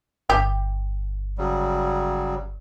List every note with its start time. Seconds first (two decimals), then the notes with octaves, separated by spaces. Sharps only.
0.30 G1 G4
1.38 C#3 F#3 G3